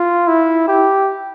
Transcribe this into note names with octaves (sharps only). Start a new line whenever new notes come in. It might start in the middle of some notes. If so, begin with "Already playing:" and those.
Already playing: F4
E4
G4